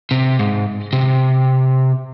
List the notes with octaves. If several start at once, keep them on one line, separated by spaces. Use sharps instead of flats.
C3
G#2
C3